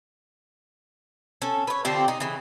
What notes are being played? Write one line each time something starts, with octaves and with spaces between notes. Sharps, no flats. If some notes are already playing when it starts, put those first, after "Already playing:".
C#4 A4
B4 C#5
D3 F3 C4 G4
D#4
C#3 E3